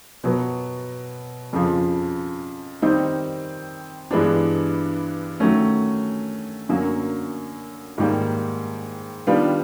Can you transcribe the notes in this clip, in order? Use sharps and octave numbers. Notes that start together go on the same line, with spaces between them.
B2 F#3 B3
F2 C#3 F3
D#3 G3 C4 D#4
G2 E3 G#3 B3 D4
D#3 F#3 A3 C#4
F#2 D3 F#3 A#3
G#2 D#3 G3 A#3
D#3 G3 B3 D4 F4